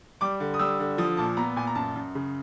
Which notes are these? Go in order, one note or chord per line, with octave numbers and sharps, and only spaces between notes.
G3 D6
D3
D#6
G3 E6
D3
F3 D#6
A#2 A5
B3 A#5
A#2 G#5
A#5
F#2 A5
F#2
C#3